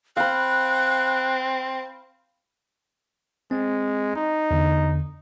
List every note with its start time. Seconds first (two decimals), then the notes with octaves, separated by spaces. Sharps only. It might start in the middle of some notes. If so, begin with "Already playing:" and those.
0.17 C4 F5 B5 F#6
3.51 G#3 C4
4.16 D#4
4.51 E2 D3